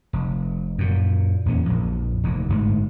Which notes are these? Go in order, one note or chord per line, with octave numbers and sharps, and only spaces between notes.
F1
F#2 A#2
E2 A#2 A#3 C#4
A#1 F2
F1 D#2
G1 G#2 A3